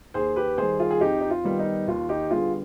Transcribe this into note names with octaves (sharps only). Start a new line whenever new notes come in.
D#2 G#4 C5
G4 B4
D#3 G3 G#4 C5
F4 G#4
G#4
F2 D#4 G4
D#4
F4
D#3 G3 B3
D#4
D#2 F4
D#4 G4
D3 G3 B3 F4 G#4